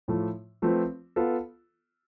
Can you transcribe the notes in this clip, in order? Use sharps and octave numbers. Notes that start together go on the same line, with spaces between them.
A2 F3 A3
F3 A3 C4 F4 B4
B3 F4 A4